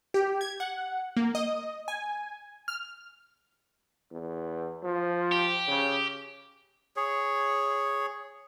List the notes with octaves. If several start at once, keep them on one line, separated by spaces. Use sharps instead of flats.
G4
G#6
F#5
A#3
D#5
G#5
F6
E2
F3
G4
C#3
G#4 C#5